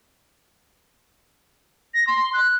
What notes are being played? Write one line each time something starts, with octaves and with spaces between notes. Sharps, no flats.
A#6
C6
F#6